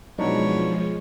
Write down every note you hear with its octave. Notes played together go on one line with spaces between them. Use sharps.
B2 F3 F#3 G#3 D4 D#4 C#5